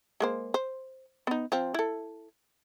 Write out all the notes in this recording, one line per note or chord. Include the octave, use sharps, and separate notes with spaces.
G#3 A#3 C5
C5
B3 D#4
F3 C4
E4 A4